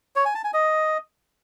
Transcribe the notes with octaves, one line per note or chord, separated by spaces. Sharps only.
C#5
G#5
A5
G#5
D#5